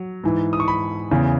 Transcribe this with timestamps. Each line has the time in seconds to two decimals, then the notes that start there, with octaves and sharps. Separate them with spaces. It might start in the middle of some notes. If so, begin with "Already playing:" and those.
Already playing: F#3
0.24 G#2 E3
0.53 D#6
0.60 C#6
0.68 B5
1.11 E2 C#3 E3